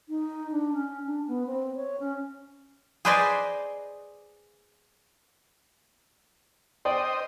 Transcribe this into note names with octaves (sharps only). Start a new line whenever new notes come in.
D#4
D4
C#4
D4
B3
C4
C#5
C#4
G#4 B4 C5 D5 D#5 G#5
C5 D5 D#5 G5